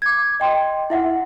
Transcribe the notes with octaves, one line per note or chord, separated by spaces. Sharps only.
D6 G#6
D#5 G5 C6
E4 E5 F#5